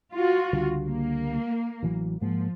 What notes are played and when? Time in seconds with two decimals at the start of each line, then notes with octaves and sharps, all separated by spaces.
0.13 F4 F#4
0.53 C#2 D3 G3
0.86 A#3
1.83 A1 E3 F#3
2.21 G#2 F3 G#3 A#3